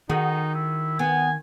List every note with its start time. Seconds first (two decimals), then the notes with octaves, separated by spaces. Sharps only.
0.10 D#3 D#4 F#4 G#4
0.55 E4
0.99 B3 G#5